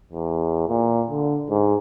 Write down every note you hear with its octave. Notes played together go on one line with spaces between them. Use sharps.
E2
A#2
D3
G#2